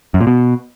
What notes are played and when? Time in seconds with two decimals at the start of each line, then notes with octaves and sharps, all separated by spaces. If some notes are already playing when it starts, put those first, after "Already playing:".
0.14 F#2
0.21 A#2
0.27 B2